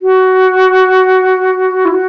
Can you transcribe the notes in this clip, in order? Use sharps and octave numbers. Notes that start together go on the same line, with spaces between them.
F#4
E4
F#4